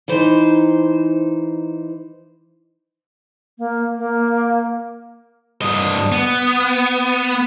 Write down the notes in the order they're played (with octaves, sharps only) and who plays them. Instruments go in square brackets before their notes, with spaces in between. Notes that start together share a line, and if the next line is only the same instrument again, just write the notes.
[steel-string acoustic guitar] E3 D#4 C5
[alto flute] A#3
A#3
[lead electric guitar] G2 D#5
B3